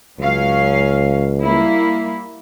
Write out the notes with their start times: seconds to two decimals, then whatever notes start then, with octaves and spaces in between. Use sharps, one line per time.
0.19 C#2 F#3 C#4 F5
1.43 G3 A#3 E4